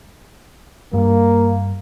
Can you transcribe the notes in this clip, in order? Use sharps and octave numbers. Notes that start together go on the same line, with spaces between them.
G2 G3 A#3